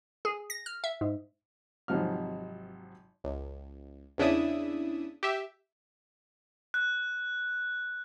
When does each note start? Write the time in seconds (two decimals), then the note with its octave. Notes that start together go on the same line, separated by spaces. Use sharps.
0.25 G#4
0.50 A#6
0.66 F6
0.84 E5
1.01 G#2
1.88 G#1 C3 F3 F#3 D#4 F6
3.24 C#2
4.18 E2 C#3 D4 E4 E5 D#6
5.23 G4 E5
6.74 F#6